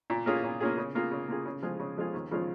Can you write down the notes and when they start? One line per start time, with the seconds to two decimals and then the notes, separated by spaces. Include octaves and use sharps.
0.10 A#2
0.26 A#3 C#4 F4 G#4
0.43 A#2
0.60 A#3 C#4 F4 G#4
0.78 C#3
0.95 A#3 F4 G#4
1.12 C#3
1.28 A#3 F4 G#4
1.46 C#3
1.63 F3 G#3 F4 G#4
1.80 C#3
1.97 F3 G#3 F4 G#4
2.14 D#2
2.31 C#3 F3 G#3 F4